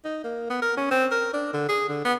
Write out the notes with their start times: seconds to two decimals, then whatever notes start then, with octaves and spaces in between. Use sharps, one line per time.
0.05 D#4
0.24 A#3
0.50 B3
0.62 A#4
0.77 C#4
0.91 C4
1.12 A#4
1.34 D4
1.53 D3
1.69 G#4
1.89 D3
2.05 B3